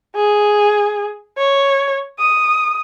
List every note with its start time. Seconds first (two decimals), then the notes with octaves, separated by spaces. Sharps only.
0.16 G#4
1.37 C#5
2.19 D#6